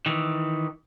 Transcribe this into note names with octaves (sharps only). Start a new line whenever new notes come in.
D#3 E3